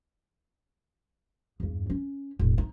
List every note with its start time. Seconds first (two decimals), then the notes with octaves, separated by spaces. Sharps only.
1.60 E2 G2
1.90 C#4
2.39 E1 A2
2.58 D#4